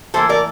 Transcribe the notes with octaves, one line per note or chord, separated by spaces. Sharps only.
A2 E3 A#3 A4 C5
A#4 D5